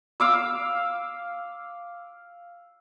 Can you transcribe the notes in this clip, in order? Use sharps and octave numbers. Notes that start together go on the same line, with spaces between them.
F5 D6 E6